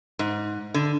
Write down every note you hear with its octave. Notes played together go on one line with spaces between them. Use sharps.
G#2
D3